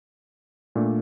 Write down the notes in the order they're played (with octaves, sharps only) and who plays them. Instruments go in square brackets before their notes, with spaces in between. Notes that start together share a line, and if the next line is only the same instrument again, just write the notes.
[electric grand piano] A#2 A3 D4